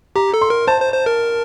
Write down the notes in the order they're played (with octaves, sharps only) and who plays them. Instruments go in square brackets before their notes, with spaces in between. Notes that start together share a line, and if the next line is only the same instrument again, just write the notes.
[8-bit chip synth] G4 [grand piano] A#5
[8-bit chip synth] A4
[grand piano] C6
[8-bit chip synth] A#4
[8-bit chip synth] C5 [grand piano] A5
[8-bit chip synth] C5
C5
A#4